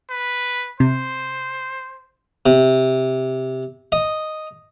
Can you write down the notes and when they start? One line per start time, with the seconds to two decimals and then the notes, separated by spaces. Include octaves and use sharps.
0.10 B4
0.80 C3 C5
2.46 C3
3.92 D#5